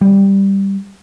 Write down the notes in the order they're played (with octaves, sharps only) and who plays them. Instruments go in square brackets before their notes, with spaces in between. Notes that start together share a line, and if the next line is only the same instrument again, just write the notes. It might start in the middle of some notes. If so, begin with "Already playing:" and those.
[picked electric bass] G3